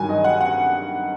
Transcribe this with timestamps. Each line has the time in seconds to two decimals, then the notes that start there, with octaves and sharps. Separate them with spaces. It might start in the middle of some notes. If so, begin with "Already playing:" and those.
Already playing: G2 D#3 F#3 G#5
0.09 D#5
0.24 F#5
0.41 F#5